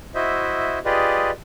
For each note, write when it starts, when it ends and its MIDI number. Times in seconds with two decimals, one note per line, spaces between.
0.15 0.79 64
0.15 0.79 66
0.15 0.79 72
0.15 0.79 75
0.15 0.79 76
0.85 1.31 65
0.85 1.31 67
0.85 1.31 68
0.85 1.31 71
0.85 1.31 74
0.85 1.31 75